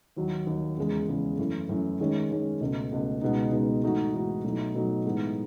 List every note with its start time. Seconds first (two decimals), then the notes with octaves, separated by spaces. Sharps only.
0.16 D#2 D#3 F#3
0.47 D#2 D#3 F#3
0.77 E2 C#3 G#3
1.08 E2 C#3 G#3
1.38 F#2 E3 A3
1.69 F#2 E3 A3
2.00 D#3 G#3 C#4
2.31 D#3 G#3 C#4
2.60 C#2 B2 A3
2.91 C#2 B2 A3
3.22 C#2 B2 G#3 B3 D#4
3.52 C#2 B2 G#3 B3 D#4
3.84 G#2 E3 A3 D#4 F#4
4.14 G#2 E3 A3 D#4 F#4
4.44 B2 F#3 A3 D#4
4.74 B2 F#3 A3 D#4
5.05 A2 E3 G#3 B3 D#4